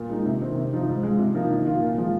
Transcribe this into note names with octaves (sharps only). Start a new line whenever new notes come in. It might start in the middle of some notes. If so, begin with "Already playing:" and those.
Already playing: A#2
G#3 D#4
C3
D#3 C4
C3
F3 C4 D#4
G#2
G#3 F4
C3
F3 A#3 D#4
D#3
A#3 F4
A#2
F3 G#3 F4